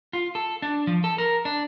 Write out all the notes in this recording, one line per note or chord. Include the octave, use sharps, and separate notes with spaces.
F4
A4
D4
F3
A4
A#4
D4